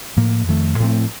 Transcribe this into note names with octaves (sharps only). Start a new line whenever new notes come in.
A2 F3 A#3
F2 D#3 A3
A2 F3 A3 C4